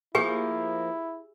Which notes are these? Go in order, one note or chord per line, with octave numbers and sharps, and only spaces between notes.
F3 A#3 E4 G4 G#4 G#5